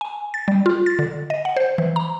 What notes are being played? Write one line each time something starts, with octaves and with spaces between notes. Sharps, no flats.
G#5
A6
G3
F4
A6
D3
D#5
F#5
C5
E3
A#5